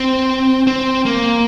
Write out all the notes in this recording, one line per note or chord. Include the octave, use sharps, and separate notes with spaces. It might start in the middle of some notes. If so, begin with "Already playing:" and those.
Already playing: C4
C4
A#3